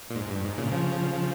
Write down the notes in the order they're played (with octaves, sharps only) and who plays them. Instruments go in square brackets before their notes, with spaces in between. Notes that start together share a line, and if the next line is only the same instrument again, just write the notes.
[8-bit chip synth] A#2
G#2
G2
G#2
A#2 C#3
C#3 F3